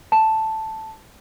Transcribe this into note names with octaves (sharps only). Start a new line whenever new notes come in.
A5